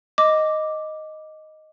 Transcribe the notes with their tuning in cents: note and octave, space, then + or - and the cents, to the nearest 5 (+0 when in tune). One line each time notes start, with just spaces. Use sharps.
D#5 +0 D6 +0